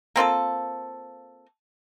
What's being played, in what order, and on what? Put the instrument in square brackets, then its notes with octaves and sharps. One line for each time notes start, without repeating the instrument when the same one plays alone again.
[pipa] A#3 C4 F4 A4